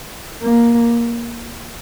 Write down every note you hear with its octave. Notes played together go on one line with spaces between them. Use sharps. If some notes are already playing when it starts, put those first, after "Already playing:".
A#3